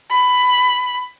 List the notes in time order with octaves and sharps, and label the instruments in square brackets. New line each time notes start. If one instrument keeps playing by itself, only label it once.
[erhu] B5